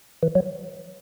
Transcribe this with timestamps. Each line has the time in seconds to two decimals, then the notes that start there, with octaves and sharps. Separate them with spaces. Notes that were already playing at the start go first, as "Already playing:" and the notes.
0.23 E3
0.35 F#3